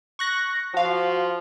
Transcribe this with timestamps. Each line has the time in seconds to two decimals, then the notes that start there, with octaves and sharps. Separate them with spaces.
0.19 C#6 F#6 A#6
0.74 F3 F#4 F5